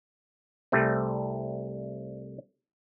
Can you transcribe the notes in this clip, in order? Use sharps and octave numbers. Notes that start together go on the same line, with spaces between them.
C2 G3 A3 C4